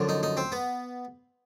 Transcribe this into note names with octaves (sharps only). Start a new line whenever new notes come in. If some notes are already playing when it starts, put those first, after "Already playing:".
Already playing: F#2 D3 F3
D#4
D#4
C4
B3